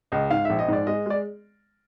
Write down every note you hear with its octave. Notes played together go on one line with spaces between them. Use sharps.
C#2 D#5
G#2 F5
A#1 E5
D#5
G#2 D5
G#3 D#5
G#3 D5